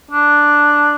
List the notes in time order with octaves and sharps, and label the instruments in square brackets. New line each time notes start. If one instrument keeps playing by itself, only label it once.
[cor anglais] D4